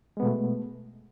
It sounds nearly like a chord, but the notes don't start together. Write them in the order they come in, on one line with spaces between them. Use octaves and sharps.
G#3 B3 B2 A3